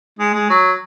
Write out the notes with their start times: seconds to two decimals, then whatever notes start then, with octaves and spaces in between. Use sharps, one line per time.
0.19 G#3
0.34 G#3
0.50 F#3